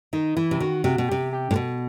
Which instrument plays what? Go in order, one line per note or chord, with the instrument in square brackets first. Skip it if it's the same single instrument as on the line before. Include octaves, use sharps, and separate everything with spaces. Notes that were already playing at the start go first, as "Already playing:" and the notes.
[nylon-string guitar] D#3 [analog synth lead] D#4
[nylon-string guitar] E3 [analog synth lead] E4
[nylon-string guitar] C3
[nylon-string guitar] D#3 [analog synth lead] F#4
[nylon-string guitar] C3 [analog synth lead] F#4
[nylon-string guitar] B2
[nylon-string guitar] C3 [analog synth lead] G4
[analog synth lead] G4
[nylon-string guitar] A2
B2